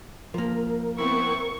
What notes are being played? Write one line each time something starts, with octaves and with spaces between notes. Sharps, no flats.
F3 A#3 A#4
B3 C4 E4 C#6